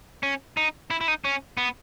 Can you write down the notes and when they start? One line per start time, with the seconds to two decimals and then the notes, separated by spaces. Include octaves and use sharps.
0.23 C#4
0.57 D#4
0.90 E4
1.01 E4
1.08 D#4
1.25 C#4
1.57 B3